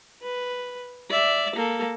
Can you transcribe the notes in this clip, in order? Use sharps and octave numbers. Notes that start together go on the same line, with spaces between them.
B4
D5 E5
A#3 A4